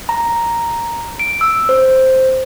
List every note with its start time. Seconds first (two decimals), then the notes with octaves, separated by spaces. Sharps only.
0.09 A#5
1.19 D7
1.41 E6
1.69 C5